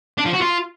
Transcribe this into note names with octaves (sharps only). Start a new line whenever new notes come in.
D4
F3
F#4
F4